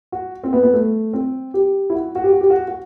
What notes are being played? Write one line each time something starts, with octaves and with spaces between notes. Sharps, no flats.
F#4
C4
B3
B3
A3
C4
G4
E4
F#4
F#4
G4
F#4
G4
F#4
F#4